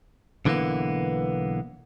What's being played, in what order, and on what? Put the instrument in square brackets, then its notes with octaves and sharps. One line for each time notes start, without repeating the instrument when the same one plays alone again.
[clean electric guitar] B1 D3 E3 G3 A#3 B3